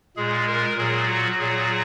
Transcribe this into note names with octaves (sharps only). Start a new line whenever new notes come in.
A#2 G#3 G#4
A#4
A#2 F#3 G#4
F#4
A#2 F#3 G#4